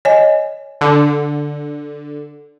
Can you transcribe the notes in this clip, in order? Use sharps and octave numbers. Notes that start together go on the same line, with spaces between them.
C#5 D#5 G#5
D3